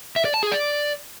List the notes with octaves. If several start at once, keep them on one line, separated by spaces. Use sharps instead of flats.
E5
D5
A5
G#4
D5